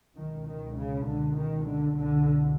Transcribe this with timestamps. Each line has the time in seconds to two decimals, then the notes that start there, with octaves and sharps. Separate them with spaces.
0.15 C#2 B2 D#3
0.46 D#3
0.76 C#3
1.05 D3
1.36 D#3
1.66 D3
1.96 C2 B2 D3